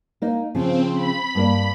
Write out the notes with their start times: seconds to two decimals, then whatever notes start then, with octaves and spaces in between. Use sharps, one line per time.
0.22 A#3 D#4
0.55 C#3 F3 C4
0.94 B5
1.35 G2 A#3 D5